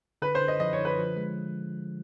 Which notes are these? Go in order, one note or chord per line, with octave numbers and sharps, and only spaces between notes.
D3 B4
C5
D3
D#5
F3 D#5
C#5
D3
B4
F3
G#3